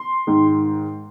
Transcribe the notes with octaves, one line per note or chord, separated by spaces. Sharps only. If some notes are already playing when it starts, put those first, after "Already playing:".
Already playing: C6
G#2 D#3